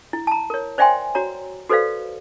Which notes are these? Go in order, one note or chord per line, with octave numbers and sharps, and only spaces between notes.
E4
A5 A#5
A#4 C#5
C5 D5 E5 G5 G#5 C6
F#4 C#5 A#5
F#4 A4 B4 C5 D5 F5